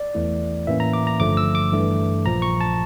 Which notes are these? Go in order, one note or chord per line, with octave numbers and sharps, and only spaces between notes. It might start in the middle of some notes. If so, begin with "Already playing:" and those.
Already playing: D5
E2 E3 A3 E4
A2 E3 A#3 C#4 E5
A#5
D6
A#5
G1 G2 D3 F3 A3 D6
E6
D6
G2 E3 A3
A#1 A#2 F3 A#5
C#6
A5